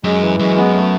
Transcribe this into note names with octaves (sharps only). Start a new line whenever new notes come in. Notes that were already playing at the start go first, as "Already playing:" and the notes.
F#2 G#3
E3
F#2 G#3
B3
A3